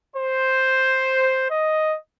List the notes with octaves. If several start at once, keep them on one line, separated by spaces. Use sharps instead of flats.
C5
D#5